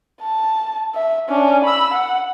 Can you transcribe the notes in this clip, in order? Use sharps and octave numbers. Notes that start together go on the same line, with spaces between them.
A5
E5
C#4 D4
B5 E6
F#5